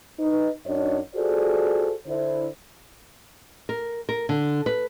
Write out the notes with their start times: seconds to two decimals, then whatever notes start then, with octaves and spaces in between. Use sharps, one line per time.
0.19 D#4 B4
0.66 F#2 D4 D#4 F#4 C#5 D#5
1.15 F4 F#4 G#4 A4 C5 D5
2.07 D3 E4 C5
3.69 A#4
4.09 A#4
4.29 D3
4.66 B4